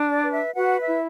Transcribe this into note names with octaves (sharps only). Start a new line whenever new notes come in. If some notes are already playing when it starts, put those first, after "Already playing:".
Already playing: D4
D5
B4
E5
F#4 B4 F#5
E5
E4